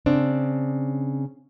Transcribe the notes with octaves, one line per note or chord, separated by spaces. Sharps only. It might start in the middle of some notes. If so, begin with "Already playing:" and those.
C#3 C4 D4